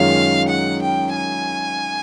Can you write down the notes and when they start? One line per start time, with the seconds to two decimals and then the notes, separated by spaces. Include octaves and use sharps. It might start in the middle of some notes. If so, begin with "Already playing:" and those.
Already playing: F#2 D#3 G#3 C#4 F4 F5
0.48 F#5
0.82 G5
1.16 G#5